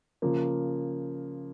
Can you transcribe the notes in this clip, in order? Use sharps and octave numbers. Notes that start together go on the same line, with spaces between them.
C#3 F3 A#3